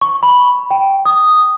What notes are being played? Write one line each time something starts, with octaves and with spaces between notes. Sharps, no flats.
C#6
B5
G5
D#6